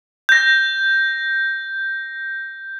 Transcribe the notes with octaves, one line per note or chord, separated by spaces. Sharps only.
G6 A#6